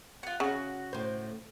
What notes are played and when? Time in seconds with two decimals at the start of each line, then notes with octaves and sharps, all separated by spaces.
0.23 F4 F#5
0.40 C#3 F#4
0.93 A2 C5